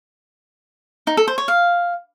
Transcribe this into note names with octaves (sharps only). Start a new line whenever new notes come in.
D#4
A4
C5
C#5
F5